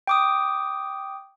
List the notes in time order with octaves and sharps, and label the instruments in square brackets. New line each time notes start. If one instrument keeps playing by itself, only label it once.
[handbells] G5 D6 D#6